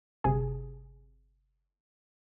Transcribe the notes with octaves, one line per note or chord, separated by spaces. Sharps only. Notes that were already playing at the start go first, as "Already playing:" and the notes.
G1 C3 G#4